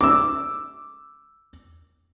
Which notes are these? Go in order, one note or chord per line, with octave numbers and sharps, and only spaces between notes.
D6 E6